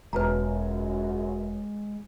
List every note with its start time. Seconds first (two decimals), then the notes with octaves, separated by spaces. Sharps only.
0.13 E1 C#2 F#2 G#3 B4 A5 A#5